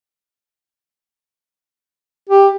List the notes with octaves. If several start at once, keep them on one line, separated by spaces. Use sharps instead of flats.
G4